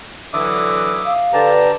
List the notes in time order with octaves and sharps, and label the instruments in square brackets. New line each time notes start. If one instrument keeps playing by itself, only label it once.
[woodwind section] D3 E3 F#3 [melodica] E5 D6 D#6
[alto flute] F5
[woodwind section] D3 A5 [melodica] G4 A#5 [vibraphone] B4 D5